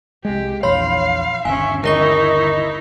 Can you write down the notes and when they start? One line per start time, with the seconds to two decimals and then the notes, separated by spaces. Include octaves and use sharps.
0.25 C2 G#3 G4
0.63 A#1 E2 C#5 F5 B5 C6
1.45 G1 D#2 C#3 C#4 E5 G#5
1.84 D3 D#4 E4 A#4 D#5 C#6 G7